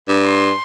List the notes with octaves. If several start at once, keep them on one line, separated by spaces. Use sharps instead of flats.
G2
C6